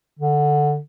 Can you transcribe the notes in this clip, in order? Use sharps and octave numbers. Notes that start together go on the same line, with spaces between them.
D3